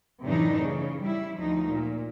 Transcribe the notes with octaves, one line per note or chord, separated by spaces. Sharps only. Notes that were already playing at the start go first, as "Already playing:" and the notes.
F#2 A2 C3 E3 D4 D#4
C#3
G3 E4
D2 F3 D#4
A#2